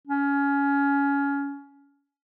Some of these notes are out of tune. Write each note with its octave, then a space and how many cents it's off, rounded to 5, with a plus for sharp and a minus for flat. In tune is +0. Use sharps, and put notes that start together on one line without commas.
C#4 +20